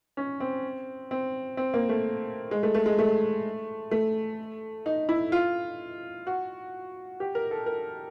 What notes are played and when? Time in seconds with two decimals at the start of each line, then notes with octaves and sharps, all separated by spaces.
0.17 C#4
0.40 C4
1.11 C4
1.57 C4
1.74 A#3
1.89 A3
2.51 G#3
2.63 A3
2.74 A3
2.86 G#3
2.99 A3
3.91 A3
4.86 D#4
5.09 E4
5.32 F4
6.27 F#4
7.20 G4
7.35 A#4
7.51 A4
7.66 A#4